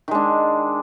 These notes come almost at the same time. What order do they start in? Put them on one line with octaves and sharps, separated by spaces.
D#3 G#3 D4